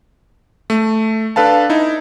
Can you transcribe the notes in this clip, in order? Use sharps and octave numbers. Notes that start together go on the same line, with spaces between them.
A3
D4 A4 B4 F5 A5
D#4 E4